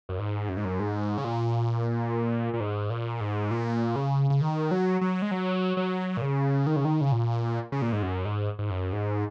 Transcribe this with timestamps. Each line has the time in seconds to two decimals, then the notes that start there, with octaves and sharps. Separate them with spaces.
0.09 F#2
0.19 G#2
0.49 F#2
0.57 G#2
0.65 F#2
0.80 G#2
1.18 C#3
1.24 A#2
2.54 A#2
2.60 G#2
2.90 A#2
3.21 G#2
3.51 A#2
3.96 C#3
4.30 C#3
4.41 D#3
4.71 F#3
5.01 F#3
5.22 G#3
5.31 F#3
5.77 F#3
6.17 A#2
6.22 C#3
6.67 D#3
6.76 C#3
6.85 D#3
7.01 C#3
7.12 A#2
7.72 C#3
7.82 A#2
7.93 G#2
8.03 F#2
8.25 G#2
8.59 G#2
8.70 F#2
8.93 G#2